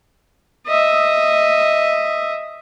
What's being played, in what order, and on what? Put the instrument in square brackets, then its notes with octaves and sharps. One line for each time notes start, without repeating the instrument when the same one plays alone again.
[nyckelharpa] D#5 E5